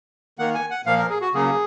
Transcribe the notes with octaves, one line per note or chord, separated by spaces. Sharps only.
D#3 A#3 F#5
G#5
F#5
A#2 F3 A#3 F5
A#4
G#4
F#4
C#3 F#3 A#3 G#4